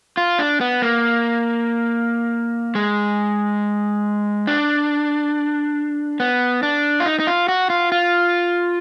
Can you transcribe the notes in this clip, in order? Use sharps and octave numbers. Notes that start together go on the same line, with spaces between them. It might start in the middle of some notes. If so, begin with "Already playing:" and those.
F4
D4
B3
A#3
G#3
D4
B3
D4
F4
D#4
D#4
F4
F#4
F4
F4